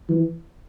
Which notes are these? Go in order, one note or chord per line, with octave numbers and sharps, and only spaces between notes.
E3